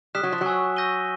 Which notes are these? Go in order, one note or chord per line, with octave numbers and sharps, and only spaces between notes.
G3 D#6 F#6 B6 E7
F#3
F3
F#3
G#5 C#6 E6
E6 G6 A#6 D#7 G7